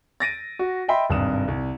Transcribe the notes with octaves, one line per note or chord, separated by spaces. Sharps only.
A6 A#6 D7 D#7
F#4
D#5 E5 G5 B5 C6
G#1 G2 C3 D#6 E7
C2